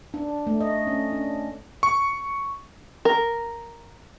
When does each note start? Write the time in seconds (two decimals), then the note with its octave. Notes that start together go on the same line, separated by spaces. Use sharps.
0.14 D4
0.47 A3
0.61 D#5
0.87 C#4
1.12 D4
1.83 C#6
3.05 A#4